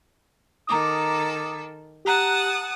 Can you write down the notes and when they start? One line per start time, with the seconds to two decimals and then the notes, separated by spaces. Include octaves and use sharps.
0.67 D#3 A4 A#5 D6 D#6
2.05 G4 F#5 A5 A#5 D#6 F#6